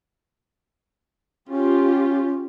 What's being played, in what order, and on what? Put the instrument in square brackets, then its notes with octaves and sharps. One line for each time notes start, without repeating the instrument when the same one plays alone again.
[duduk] C#4 [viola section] F4 G4